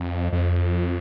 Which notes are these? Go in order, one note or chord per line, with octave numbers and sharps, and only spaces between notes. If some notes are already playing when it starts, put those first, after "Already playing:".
Already playing: F2
F2